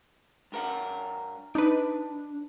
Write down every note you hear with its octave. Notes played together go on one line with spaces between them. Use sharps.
G2 A#4 F#5
D4 D#4 B4